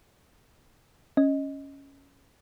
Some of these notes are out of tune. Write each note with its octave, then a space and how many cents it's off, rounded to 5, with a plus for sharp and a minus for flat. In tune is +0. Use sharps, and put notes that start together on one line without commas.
C#4 +0 D#5 +5